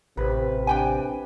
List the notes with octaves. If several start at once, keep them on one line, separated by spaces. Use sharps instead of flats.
A1 C3 B4
D4 G5 G#5